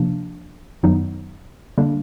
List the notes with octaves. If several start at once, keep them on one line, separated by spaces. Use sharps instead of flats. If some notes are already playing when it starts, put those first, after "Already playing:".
Already playing: C3 F3 A#3 D4
F#2 D#3 F#3 B3 D#4
D3 G3 A#3 D4